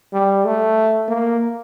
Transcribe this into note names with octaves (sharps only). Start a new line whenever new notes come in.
G3
A3
A#3